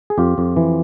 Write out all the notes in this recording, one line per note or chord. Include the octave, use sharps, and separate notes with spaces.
G#4
F2 F4 G4
F2
E3